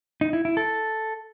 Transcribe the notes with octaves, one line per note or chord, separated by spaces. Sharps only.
D#4
E4
E4
A4